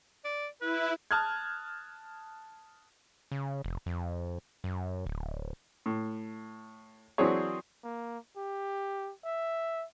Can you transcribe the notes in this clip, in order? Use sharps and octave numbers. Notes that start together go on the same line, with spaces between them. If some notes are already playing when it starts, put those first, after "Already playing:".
D5
E4 B4
A5 D#6 F6 F#6 G#6
C#3
F1
F2
F#2
D1
A2
E3 F#3 C4 D4 G#4 C#5
A#3
G4
E5